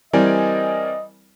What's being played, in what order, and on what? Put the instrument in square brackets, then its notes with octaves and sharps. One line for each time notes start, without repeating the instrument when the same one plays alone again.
[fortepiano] E3 G3 C4 [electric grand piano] A#4 D5 G#5 [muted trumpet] D#5